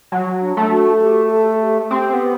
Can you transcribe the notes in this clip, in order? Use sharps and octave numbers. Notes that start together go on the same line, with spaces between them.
F#3
D4
A3
F#4
G4
A4
G4
C4 G4
B3